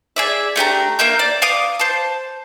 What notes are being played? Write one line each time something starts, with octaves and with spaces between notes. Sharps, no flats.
G#4 D5 E5
A3 D4 G4 A#5
A#3 A#4 E5 G6
D5
F5 D6 D#6
C5 A5